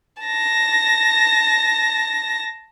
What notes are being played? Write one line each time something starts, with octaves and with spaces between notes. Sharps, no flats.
A5 A#6